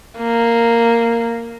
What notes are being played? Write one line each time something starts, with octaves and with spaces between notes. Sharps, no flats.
A#3